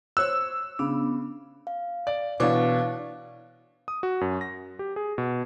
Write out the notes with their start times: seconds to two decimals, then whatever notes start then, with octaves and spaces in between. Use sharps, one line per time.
0.17 C5 C#5 E6 F#6
0.79 C#3 B3 D4
1.67 F5
2.07 D5
2.40 B2 E3 D4 C#5 F5 D6
3.88 D#6
4.03 F#4
4.21 F#2
4.41 A#6
4.79 G4
4.96 G#4
5.18 B2